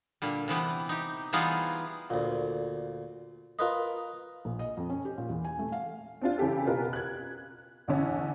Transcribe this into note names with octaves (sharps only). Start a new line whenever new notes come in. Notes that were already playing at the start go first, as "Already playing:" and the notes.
A#2 D3 G3
C3 E3 B3 G4
D#4 G4
E3 G3 B3 D#4 F4 G#4
D2 A#2
F4 A#4 B4 D#5
A#1
D#5
F2
C#4
G4
A#2
E2
G#5
A3
F5
C4 D4 F4
C#3 E3 C4 G4 A4
B2 F4 G4 A#4 B4
F#6 G#6
A1 E2 D3 C#4